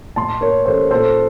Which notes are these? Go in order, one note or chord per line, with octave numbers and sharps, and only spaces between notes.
A2 A5 C6
A#3 A#4 C#5
A1 A4 C5
A#2 A4 C5